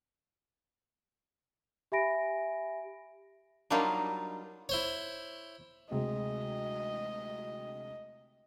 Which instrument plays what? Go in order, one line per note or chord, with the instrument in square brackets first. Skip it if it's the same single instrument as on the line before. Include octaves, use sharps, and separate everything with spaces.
[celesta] G4 E5 G#5 B5 A#6 D7
[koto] F#3 G3 A#3 D4 D#4 F4
[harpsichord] E4 C5 C#5
[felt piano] D2 C3 G#3 [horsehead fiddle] D#5